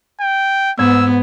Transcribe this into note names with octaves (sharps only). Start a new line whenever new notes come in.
G5
G#2 B3 E6 G#6